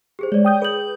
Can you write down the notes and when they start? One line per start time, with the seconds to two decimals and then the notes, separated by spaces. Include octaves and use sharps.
0.19 G4 G#4 C5
0.32 G#3 C#5 D5
0.45 G5 D#6 G6
0.62 G#4 B4 G6 F#7